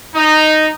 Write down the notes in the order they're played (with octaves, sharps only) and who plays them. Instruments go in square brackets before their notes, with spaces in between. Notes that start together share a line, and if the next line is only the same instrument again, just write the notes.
[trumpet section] D#4